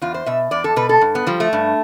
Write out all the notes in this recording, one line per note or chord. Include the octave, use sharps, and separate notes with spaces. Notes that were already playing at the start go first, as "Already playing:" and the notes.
E2 F4
C5
B2 E5
E2 D5
A4
B2 B4
A4
G2
B3
F3 G3
A3
G2